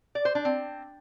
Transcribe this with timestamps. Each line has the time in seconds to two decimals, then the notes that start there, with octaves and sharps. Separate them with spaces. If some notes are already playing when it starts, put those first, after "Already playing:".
0.15 D5
0.25 C5
0.35 D4
0.45 C4